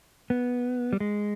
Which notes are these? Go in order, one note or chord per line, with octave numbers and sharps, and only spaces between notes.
B3
G3
G#3